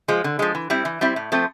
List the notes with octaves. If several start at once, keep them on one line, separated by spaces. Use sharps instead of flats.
F3 G#3
D3
F3 G#3
E3
G3 C4 E4
E3
G3 C4 E4
A2
F3 A3 C4